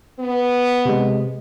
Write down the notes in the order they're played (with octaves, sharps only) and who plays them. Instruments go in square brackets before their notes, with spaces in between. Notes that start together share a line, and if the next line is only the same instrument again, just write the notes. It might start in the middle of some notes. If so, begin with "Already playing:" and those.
[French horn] B3
[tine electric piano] C3 G#3